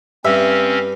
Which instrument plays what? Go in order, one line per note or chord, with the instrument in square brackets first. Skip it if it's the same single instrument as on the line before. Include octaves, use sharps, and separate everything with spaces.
[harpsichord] G2 [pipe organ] C4 C#4 [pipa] E5